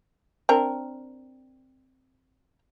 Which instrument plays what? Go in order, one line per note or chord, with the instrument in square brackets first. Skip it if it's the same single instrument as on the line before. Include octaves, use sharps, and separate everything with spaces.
[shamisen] C4 D4 A#4